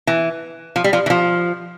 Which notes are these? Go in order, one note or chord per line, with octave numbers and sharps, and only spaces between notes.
E3
F3
G3
F3
E3
F3